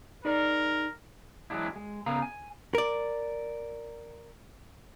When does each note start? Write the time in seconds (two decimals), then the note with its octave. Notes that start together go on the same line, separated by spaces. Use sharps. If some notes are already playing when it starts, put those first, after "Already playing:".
0.25 D#4 G#4 A#4 D5
1.50 E3 F#3 G#3 D4 E4
1.76 G#3
2.06 C#3 B3 F5 A#5
2.22 G#5
2.75 A#4 D5